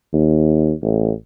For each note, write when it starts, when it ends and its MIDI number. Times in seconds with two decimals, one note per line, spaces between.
0.13 0.73 39
0.82 1.12 33